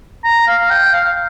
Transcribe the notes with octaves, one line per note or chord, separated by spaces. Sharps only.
A#5
F5
G5
F5